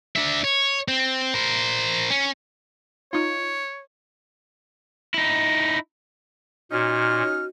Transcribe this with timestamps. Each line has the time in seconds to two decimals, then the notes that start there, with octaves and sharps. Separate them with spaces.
0.16 D4 E5
0.44 C#5
0.88 C4
1.34 A#4 C5
2.10 C#4
3.13 D#4 F4 C#5
5.14 D#4 E4
6.72 A#2 C#4 D#4 F#4 F6